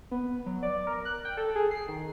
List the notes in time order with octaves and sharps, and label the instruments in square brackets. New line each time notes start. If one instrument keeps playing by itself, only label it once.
[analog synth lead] B3
F#3
D5
A#4
F#6
G5
A4
G#4
C7
D#3